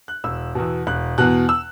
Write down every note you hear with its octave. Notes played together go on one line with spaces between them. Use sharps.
F#6
E1 E6
E2 B2
E1 F#6
E2 B2 F#6
E6